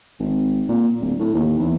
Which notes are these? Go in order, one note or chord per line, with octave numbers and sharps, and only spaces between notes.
G#1
A#2
D1
A2
D#2
E2